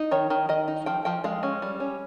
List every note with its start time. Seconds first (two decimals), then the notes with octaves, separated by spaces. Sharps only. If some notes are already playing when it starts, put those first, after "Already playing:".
Already playing: D#4
0.11 D#3 C#5
0.30 D#3
0.49 D#3 D#5
0.68 D#4
0.86 F3 G5
1.05 F3 G5
1.24 G#3 F5
1.43 C#4
1.62 G3
1.80 C#4